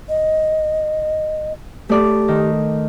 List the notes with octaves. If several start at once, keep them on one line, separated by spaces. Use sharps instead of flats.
D#5
A3 G4 D5
D#3